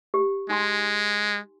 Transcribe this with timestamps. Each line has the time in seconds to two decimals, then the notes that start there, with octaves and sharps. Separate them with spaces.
0.14 G4
0.49 G#3 D#4 G#5 C6